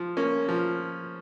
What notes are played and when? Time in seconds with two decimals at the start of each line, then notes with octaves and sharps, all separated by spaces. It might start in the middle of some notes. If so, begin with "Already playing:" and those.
Already playing: F3
0.17 A#3 C#4
0.49 F3